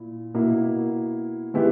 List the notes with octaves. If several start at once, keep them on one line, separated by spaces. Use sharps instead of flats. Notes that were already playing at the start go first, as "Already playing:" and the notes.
Already playing: A#2 E4
B2 A#3 E4
D#3 G#3 B3 E4 G4